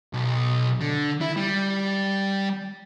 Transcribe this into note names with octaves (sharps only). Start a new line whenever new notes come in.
B1
D3
E4
G3